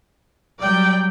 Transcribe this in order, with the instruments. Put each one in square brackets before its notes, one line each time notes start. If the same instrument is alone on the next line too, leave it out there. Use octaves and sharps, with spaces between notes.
[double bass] F#3 G3 [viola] D5 G5